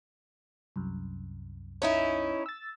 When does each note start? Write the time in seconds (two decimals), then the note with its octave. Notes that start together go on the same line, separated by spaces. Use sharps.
0.76 C2 F#2
1.82 C#4 D#4 E4
2.46 E6 A6